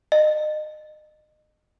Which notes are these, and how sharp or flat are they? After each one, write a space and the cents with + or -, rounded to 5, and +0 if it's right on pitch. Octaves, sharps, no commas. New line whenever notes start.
D#5 -30